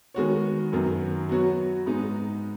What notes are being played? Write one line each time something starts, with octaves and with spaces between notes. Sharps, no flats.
D#3 G#3 B3 F#4 C#5
F#2 D#3 F#3 B3
F#3 B3 F#4 C#5
G#2 G#3 B3 D#4